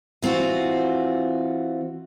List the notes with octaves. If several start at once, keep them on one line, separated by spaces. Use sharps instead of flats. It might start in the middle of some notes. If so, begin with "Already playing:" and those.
E3 C4 F4 F#4